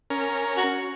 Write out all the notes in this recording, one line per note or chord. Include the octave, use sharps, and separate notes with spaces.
C#4 A#4
F#4